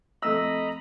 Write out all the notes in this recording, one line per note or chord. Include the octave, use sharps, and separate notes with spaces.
F2 A3 D#5 A#5 B5 E6